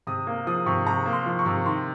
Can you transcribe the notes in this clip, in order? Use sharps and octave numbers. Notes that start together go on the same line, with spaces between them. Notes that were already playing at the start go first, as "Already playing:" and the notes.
C3 D#6
A#3
F3 D#6
C3 C#6
C3 A#5
A#3
C6
F3
C#6
C3
D#3 C6